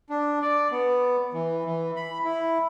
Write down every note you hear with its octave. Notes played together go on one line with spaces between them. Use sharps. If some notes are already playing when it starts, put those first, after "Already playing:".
D4
D5
B3
E3
E3
B5
E4